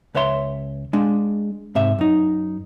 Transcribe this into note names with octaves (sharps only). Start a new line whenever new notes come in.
C#2 B4 C#5 E5 C6
G#3 D4
G#2 C3 E5
F#2 D#4